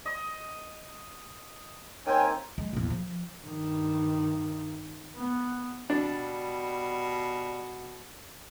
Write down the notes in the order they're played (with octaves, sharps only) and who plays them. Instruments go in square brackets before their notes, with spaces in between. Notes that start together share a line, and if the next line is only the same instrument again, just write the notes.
[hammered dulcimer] D#5
[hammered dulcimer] D#3 A#3 C4 [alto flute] C#5 [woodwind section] G5 G#5
[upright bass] G#3
A#1 E2
F3
[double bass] G2 D#3
B3
[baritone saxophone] B2 [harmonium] G3 [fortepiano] D4